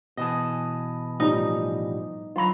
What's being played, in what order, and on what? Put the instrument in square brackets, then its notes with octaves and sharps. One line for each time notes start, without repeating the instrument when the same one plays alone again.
[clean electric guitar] B2 E3 G#4 [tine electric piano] D#5 A5
[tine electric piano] A2 F3 G3 [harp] D#4
[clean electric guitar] D3 F#3 B5 [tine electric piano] F4 A#5